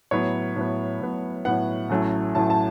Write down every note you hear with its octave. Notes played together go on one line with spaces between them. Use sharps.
A2 F#3 B3 C#5
A2 F#3 B3
A2 F#3 B3
A2 F#3 B3 F#5
A1 A2 F#3 A3 C#4
A1 A2 F#3 A3 C#4 A5
A5